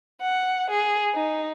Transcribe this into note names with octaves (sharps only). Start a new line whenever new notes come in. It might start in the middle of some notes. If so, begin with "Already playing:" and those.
F#5
G#4
D#4